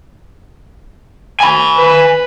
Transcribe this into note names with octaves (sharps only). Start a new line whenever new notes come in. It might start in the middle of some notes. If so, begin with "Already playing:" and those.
G#5 B5
B4